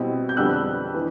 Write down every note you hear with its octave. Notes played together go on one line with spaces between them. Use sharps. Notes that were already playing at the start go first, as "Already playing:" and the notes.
Already playing: B2 G3 C4 E4
G6
F2 D3 G3 B3 D4 E6 F#6
E3